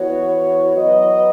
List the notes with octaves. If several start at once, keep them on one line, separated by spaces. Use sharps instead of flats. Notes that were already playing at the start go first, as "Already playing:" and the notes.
Already playing: E3 B3 F#4 C#5
F#3 B3 F#4 B4 D#5